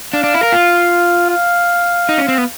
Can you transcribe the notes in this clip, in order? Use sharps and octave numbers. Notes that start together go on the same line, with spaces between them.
D4 F5
D4
E4
A#4
F4
F5
D#4
C#4
C4
B3